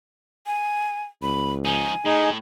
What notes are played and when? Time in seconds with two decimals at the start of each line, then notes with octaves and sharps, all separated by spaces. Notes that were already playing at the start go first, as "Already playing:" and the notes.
0.46 G#5
1.22 C#2 B5
1.65 F3 D#4 G#5
2.05 A2 D#4 G#4